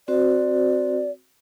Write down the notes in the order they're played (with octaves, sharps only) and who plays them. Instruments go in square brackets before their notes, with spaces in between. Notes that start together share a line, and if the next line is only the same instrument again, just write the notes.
[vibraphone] C4 F#4 C5 [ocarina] D5